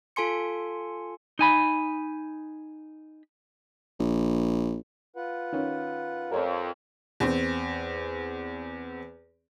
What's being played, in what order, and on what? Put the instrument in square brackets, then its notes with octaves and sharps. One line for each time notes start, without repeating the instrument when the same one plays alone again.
[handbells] F4 A4 G#5 C6 C#7
[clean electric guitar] D#4 G#5 B5
[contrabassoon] A#1
[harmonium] F4 B4 F#5
[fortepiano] D#3 C#4
[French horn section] F2 [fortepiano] A#4 C#5
[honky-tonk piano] E2 C4